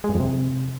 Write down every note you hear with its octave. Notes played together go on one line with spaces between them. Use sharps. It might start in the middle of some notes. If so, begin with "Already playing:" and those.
G#3
G2
F2
C3